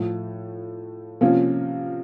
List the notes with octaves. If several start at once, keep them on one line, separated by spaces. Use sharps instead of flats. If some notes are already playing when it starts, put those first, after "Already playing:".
Already playing: A2 F3 A3
C3 F3 A#3 C#4